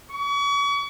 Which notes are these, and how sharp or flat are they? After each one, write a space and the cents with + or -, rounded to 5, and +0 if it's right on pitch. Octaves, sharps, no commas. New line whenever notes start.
C#6 +40